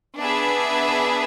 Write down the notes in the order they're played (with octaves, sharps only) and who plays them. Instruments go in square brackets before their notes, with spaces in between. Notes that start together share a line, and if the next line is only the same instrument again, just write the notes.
[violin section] B3 D4 G#4 B4 E5